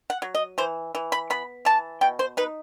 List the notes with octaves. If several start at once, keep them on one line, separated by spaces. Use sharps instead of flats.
F#5
F#3
D#5
E3 C5
E3
B5
B3 B5
E3 A5
B2 G5
C5
D#4 B4